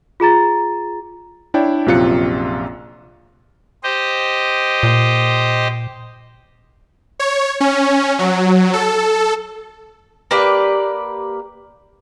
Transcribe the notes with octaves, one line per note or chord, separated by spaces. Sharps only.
F4 G#4 A#5 A6
D4 E4 C#5 D5 G5
A#1 F#2 C3 F4 F#6 C#7
G4 C5 D#5
A#2
C#5
C#4
F#3
A4
A#3 G4 B4 D5